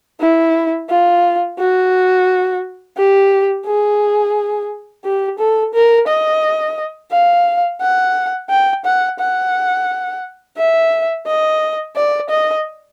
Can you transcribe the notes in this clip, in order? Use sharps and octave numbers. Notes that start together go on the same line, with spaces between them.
E4
F4
F#4
G4
G#4
G4
A4
A#4
D#5
F5
F#5
G5
F#5
F#5
E5
D#5
D5
D#5